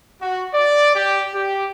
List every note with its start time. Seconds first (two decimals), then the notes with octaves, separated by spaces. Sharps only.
0.22 F#4
0.54 D5
0.96 G4
1.34 G4